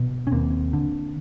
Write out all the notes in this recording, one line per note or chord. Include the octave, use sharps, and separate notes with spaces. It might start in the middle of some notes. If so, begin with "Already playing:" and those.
Already playing: B2
C#4
D#2 A#3 C4
D3